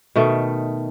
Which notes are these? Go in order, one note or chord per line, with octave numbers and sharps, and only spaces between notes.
B2 D#3 A3